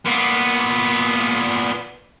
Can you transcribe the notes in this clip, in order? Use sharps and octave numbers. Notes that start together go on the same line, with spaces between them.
A#2 B3